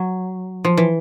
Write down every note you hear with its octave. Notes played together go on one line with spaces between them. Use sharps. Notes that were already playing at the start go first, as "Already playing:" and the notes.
Already playing: F#3
F3
E3